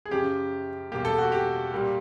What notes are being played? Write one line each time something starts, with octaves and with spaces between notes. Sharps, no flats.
G#4
F#2 C#3 F3 G4
E2 B2 G3 A#3 G4
A4
F#4
G4
A#2 G3 A#3